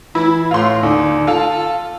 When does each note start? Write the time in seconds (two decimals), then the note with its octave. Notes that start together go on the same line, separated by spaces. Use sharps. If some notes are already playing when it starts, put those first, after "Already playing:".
0.15 E3 E4
0.51 A2 F4 C6
0.83 D#2 D3
1.27 F4 A4